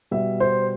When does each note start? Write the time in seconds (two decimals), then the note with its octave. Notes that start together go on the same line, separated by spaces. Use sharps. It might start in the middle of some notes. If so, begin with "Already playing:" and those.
0.11 B2 G3 E5
0.40 C5